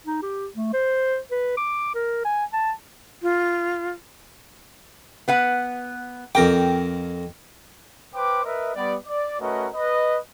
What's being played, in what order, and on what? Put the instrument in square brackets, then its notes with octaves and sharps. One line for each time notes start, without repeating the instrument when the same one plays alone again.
[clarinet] D#4
G4
A3
C5
B4
D6
A#4
G#5
A5
[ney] F4
[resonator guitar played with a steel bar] B3 B4 F#5
[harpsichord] F2 A#4 D6 [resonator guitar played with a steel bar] G5
[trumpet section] B4 C5 G5 D6
A#4 B4 D#5 E5
G3 B3 D5
D5
A3 C#4 F#4 A#4 B4 D#5
B4 D#5